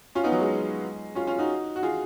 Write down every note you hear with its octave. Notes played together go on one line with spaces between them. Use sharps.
C#4 F4
B3 D#4
F#3
G#3
C#4 F4
C#4 F4
D#4 F#4
F#4
F4 G#4